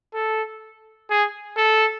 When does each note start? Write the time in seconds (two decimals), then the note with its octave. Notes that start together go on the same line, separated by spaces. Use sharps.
0.14 A4
1.10 G#4
1.57 A4